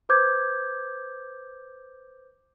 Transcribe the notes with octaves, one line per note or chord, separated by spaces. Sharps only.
B4 C5 D6 G6 G#6